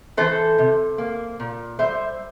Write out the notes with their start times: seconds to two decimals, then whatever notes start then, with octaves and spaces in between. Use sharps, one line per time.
0.17 E3 A4 C5
0.58 C3
0.98 A#3
1.40 A#2
1.79 G3 C5 E5